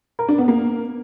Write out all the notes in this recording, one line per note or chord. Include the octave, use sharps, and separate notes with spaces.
A#4
D4
B3
A#3